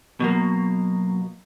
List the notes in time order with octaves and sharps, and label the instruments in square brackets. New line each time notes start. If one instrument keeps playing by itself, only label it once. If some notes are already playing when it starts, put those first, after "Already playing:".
[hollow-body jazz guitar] B2 F#3 A#3